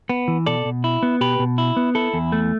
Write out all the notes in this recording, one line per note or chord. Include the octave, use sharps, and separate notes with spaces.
B3
E3
B2 A4 D5
B2
E4
B3
B2 G4 B4
B2
E4
B3
E4 A4
E2
A3